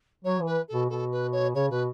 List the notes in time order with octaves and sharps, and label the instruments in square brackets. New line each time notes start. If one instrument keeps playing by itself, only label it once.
[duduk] F#3 [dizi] C#5
[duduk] E3
[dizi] B4
[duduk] B2 [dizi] A4
[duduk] B2 [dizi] A4
[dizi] B4
C#5
[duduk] C#3 [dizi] C#5
[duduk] B2 [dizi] B4